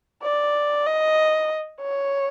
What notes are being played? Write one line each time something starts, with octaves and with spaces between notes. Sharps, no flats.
D5
D#5
C#5